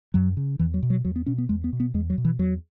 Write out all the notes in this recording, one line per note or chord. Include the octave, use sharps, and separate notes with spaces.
F#2 F#3
C#3
E2 E3
F#3
B2
F#3
E2 F#3
B3
B2 C#4
B3
E2 G#3
B3
B2
B3
E2 G#3
F#3
B2
E3
E2 F#3